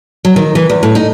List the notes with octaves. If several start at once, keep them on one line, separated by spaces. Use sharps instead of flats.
F#3
D#3
E3
E2
A2
D#4